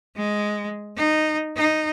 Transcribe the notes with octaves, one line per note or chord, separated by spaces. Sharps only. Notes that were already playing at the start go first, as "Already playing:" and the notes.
G#3
D#4
D#4